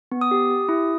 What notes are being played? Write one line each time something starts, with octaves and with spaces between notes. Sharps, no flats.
B3
D#6
G4
G4
E4